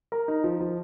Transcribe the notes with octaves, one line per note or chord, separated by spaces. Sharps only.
A#4
D#4
F3
F3